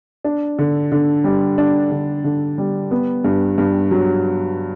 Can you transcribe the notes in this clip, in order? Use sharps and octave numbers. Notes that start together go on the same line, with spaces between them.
D4
D3
D3
G3
D4
D3
D3
G3
B3
G2
G2
F#3